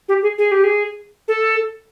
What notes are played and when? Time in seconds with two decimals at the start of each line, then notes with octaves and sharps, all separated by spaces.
0.09 G4
0.22 G#4
0.38 G#4
0.52 G4
0.64 G#4
1.28 A4